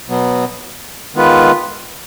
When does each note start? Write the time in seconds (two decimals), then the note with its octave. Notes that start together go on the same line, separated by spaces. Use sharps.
0.08 B2 F#3 B3
1.14 D#3 G#3 B3 F4 B4